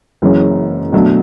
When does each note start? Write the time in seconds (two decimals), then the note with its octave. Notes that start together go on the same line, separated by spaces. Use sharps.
0.22 F#1 F#2 E3 G#3 C#4
0.92 B2 F#3 A3 D4